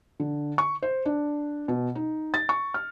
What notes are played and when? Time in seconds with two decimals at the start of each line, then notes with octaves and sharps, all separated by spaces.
0.20 D3
0.58 C#6
0.82 C5
1.06 D4
1.68 B2
1.95 D#4
2.34 A6
2.49 C#6
2.74 F6